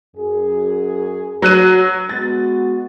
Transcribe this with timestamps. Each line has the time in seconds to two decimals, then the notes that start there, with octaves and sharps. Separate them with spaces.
0.16 F#2 G#4
1.42 F#3 F#4 F#6 D#7
2.09 G#3 B3 F#4 A6